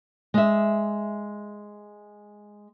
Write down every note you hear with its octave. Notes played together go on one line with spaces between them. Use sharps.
G#3 E5